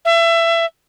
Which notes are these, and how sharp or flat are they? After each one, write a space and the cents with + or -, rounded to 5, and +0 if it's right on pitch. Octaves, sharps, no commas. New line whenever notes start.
E5 +25